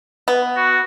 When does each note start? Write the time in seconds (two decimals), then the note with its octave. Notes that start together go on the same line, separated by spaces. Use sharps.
0.28 B3
0.56 F#4